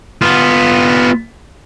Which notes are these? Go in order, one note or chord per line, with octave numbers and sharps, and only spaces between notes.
B3 F4